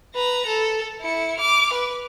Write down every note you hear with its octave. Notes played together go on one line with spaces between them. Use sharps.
B4 A#5
A4
E4 C#7
D6 F6
B4